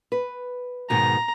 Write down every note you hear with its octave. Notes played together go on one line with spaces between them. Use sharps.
B4
G#2 B2 D#3 A#5